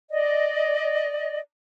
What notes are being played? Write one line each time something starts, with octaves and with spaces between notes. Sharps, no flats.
D5 D#5